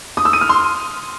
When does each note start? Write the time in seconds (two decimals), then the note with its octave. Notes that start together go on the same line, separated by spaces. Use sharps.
0.17 D#6
0.25 E6
0.33 D#7
0.41 F6
0.49 C6